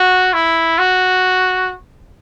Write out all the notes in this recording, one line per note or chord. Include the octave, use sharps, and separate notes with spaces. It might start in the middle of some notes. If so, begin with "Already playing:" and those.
Already playing: F#4
E4
F#4